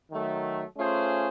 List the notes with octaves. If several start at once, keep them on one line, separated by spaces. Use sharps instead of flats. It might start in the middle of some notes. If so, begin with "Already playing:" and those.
D#3 F#3 A3
A3 C#4 F4 G#4 C5